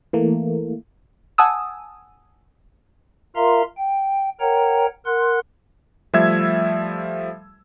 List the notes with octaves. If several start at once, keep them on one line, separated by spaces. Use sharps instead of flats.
E3 A3 A#3
F#5 G#5 A5 D#6 E6
F4 A#4 E5 F5 A#5 C6
G5
A#4 C#5 F#5 G5 A#5
A#4 F#5 C6 F#6
F3 G3 A3 E5 E6 G#6